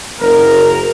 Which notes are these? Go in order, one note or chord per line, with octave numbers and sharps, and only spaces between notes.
F#1 A#4